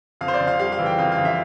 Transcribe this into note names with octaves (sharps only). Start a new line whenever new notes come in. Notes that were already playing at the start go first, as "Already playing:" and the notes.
F2 F5
C5
D5
F2
F5
G3 F5
F5
E3
G5
F2 F5
F5
F2
E5